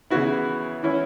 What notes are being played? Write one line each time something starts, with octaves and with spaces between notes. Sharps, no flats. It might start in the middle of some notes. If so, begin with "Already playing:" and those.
C#3 E3 B3 E4 F#4
E3 C#4 E4